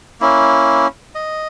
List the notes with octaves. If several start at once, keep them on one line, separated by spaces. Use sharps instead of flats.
A#3 C#4 E4
D#5